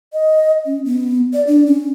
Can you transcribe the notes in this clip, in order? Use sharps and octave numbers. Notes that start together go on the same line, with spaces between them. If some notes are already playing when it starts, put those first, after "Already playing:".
D#5
C#4
B3
D5
D4
C#4